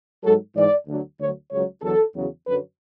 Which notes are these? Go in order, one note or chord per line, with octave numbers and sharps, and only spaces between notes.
G#2 F#3 A4
G#2 E3 D5
D2 D3 F#3
D2 D3 F#3 C#5
C#2 C#3 F#3 C#5
E2 D3 F#3 A4
E2 C#3 F#3
F#2 D3 F#3 B4